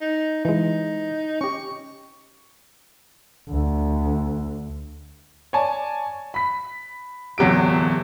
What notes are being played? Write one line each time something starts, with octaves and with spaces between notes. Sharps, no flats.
D#4
E3 G#3 D#4
C#4 G4 C#6
D2
C#5 D5 G#5 A5
B5 B6
D1 E2 F#3 G4 D7